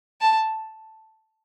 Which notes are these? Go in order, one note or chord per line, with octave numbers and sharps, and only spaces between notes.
A5